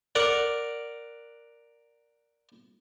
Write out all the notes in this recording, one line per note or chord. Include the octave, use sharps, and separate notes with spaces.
A#4 D5 F#5